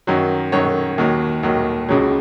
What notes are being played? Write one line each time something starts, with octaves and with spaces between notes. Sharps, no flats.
F#2 D#3 F#3
F#2 D#3 F#3 C#5
D#2 D#3 F#3
D#2 D#3 F#3
C#2 C#3 F#3